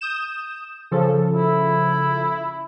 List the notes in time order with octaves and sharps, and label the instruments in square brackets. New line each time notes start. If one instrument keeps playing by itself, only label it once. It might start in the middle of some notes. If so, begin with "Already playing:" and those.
[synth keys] D#6 G6 E7
C#3 F3 A4
[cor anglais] E4